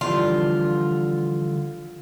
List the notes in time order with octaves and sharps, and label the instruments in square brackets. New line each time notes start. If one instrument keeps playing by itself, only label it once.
[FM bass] D3 [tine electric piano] E3 F3 G3 [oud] D4 [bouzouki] F4